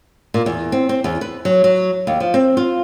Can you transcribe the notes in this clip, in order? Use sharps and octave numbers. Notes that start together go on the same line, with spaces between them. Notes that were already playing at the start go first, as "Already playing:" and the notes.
A#2
E2
C4
C4
E2
B4
F#3
F#3
D#2
F3
C4
F4